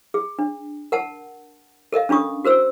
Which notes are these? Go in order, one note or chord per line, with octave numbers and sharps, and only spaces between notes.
G#4
D4
A#4 F#5 A5
A4 A#4 D#5 F5
C#4 D4 F4 C#6 D#6
F#4 A#4 C5 E6